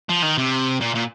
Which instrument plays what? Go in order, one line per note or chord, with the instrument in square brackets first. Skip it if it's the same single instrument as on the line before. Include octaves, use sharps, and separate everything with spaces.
[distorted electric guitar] F3
D#3
C3
A#2
A#2